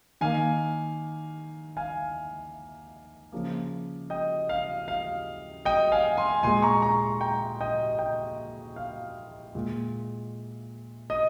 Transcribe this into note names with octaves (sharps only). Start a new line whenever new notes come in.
D#3 A#3 F5 G#5
F5 G#5
C#3 F3 A#3
D#5 G5
F5
F5
D#5 G5
F5 G#5
G#5 C6
A#2 G#3 G#5 C6
A#5 C#6
A#5 C#6
G5 A#5
D#5 G5
D#5 G5
F5
A#2 G#3
D#5